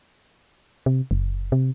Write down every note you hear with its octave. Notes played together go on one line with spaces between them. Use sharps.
C3
F#1
C3